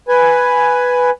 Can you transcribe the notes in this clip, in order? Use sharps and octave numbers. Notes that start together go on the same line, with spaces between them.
B4 G#5